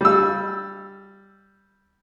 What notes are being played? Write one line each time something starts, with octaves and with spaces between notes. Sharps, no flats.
G3 E6